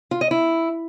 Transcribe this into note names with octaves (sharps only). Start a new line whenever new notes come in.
F4
D#5
E4